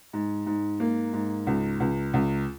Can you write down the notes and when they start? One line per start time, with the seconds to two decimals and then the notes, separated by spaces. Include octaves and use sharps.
0.13 G#2
0.46 G#2
0.80 A#3
1.13 G#2
1.47 C#2
1.80 C#2
2.14 C#2